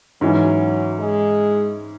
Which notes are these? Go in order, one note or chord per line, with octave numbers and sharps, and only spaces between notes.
G#2 E3 F#3 C#4
G#3